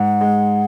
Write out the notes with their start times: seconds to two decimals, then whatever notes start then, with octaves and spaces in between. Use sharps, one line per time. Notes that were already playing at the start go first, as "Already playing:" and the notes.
Already playing: G#2 F#5
0.21 G#3